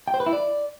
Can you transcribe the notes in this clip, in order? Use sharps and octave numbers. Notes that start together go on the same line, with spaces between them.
G5
C5
B4
E4
D5